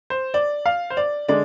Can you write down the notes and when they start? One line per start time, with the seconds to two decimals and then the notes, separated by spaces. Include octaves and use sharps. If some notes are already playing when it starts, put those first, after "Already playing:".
0.10 C5
0.34 D5
0.66 F5
0.90 C5
0.97 D5
1.28 D3 G#3 D5